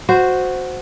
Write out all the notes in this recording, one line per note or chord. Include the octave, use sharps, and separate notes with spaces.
F#4 C5